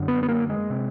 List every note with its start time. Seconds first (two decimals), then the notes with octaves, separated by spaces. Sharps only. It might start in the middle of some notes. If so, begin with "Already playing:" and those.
Already playing: F#2 D3
0.08 B3
0.23 B3
0.29 A#3
0.50 G#3
0.70 C3